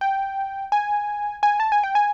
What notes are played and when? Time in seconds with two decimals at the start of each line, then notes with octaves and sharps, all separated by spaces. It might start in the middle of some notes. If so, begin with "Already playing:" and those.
0.01 G5
0.72 G#5
1.43 G#5
1.60 A5
1.72 G#5
1.84 G5
1.95 G#5